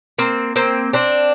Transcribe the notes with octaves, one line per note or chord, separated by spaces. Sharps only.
A#3 C4
A#3 C4
C4 D4